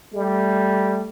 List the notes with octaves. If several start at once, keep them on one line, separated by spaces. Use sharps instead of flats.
G3 A3